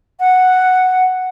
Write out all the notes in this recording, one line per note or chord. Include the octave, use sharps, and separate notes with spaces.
F#5